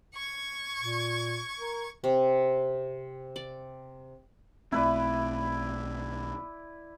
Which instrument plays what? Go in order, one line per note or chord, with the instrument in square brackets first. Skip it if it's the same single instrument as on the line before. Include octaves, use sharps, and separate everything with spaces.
[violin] C#6 G#6
[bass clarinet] A#2
A#4
[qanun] C3
D5
[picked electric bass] B1 A3 C4 [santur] E4 B4 D5